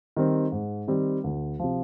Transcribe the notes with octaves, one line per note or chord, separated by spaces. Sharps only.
D#3 G3 C4
G#2
D#3 G3 C4
D2
C3 F3